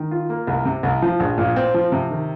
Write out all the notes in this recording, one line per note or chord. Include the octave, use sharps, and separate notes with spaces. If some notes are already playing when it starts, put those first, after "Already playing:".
Already playing: D#3
F4
A#3
C2
C3
C2
F3
A#1
A#2
C4
F3
C3
D#3